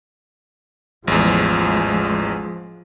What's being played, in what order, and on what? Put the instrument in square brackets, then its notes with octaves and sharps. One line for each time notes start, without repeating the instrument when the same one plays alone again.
[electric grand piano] A1 E2 [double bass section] F3 G#3